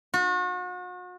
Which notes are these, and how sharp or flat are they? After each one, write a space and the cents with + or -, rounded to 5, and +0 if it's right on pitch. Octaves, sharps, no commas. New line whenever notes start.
F#4 -40